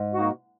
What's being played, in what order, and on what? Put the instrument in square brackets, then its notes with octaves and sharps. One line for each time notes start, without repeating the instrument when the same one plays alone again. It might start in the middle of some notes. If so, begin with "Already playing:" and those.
Already playing: [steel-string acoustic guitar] G#2
[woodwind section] A#3 D#4 F#4